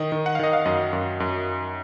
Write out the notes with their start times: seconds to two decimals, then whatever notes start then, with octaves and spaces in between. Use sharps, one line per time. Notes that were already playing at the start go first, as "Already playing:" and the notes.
Already playing: D#3 D#5
0.12 D#3
0.26 F#5
0.35 F5
0.39 D#3 D#5
0.53 F5
0.66 F#2 D#5
0.93 F#2
1.20 F#2